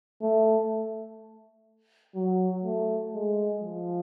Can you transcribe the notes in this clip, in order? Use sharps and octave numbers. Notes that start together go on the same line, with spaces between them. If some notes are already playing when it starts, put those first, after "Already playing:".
A3
F#3
A3
G#3
F3